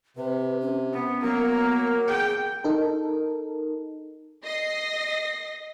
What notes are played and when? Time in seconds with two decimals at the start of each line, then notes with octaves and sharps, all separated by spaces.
0.17 C3 B4
0.61 C#4
0.92 B3 C#4
1.22 F#3 A#3 B3 A#4
2.08 G#4 G5
2.64 D#4 A4 A#4
4.44 D#5 A#6 C7